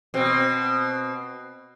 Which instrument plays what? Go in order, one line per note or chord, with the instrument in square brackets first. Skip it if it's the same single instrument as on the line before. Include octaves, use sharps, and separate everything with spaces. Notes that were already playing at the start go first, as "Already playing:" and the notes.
[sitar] B2 C4